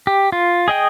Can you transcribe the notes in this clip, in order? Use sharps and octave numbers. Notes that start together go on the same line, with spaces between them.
G4
F4
G#4 D#5 G5